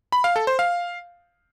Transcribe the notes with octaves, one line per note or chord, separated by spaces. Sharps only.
B5
F5
A4
C5
F5